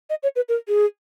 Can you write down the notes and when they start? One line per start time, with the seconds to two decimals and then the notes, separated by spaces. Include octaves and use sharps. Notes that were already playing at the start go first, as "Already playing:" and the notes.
0.10 D#5
0.23 C#5
0.36 B4
0.49 A#4
0.68 G#4